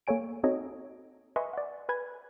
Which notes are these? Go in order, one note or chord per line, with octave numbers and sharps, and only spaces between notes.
A#3 A4 C#5 G#5 D7
C4 D#4 F#4 A4 C#5 D#5
B4 D#5 E5 G#5 C6 C#6
D5 F#5
B4 G#5 B5 G#6